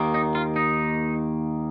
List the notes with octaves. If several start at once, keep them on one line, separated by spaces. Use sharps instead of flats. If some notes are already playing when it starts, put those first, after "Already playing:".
Already playing: D#2 D#3 A#3
D#4
F4
D#4